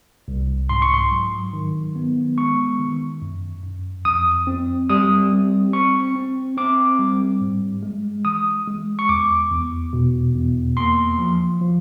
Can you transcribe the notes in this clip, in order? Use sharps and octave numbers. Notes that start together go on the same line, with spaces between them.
C2
G#2 C6
C#6
C6
F#3
D#3
B3
G#3 C#6
D#3
F#2
F#2
F2 D#6
C4
G3 D#6
C4
C4 C#6
C4
C4 D6
G3
G#2
G#3
E3 D#6
G#3
C#6
E2 D6
E2
B2
E2
A#3 C6
F3
F3